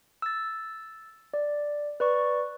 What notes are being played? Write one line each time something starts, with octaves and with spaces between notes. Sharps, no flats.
E6 A6
D5
B4 D5 C#6